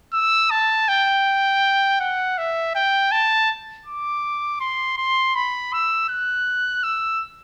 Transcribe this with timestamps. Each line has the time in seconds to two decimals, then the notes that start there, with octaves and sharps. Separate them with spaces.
0.14 E6
0.51 A5
0.89 G5
2.01 F#5
2.38 E5
2.75 G5
3.12 A5
3.86 D6
4.61 C6
4.98 C6
5.35 B5
5.73 E6
6.09 F#6
6.84 E6